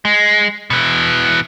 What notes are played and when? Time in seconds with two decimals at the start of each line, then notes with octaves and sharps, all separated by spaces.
0.05 G#3
0.70 B2 E3